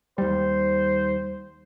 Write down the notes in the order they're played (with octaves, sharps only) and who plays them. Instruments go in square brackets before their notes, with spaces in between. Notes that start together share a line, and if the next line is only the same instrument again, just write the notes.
[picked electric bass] D#2 G3 [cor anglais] C5